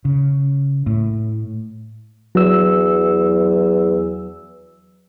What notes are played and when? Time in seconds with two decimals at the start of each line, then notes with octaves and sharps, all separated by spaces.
0.05 C#3
0.87 A2
2.35 E2 F#3 E6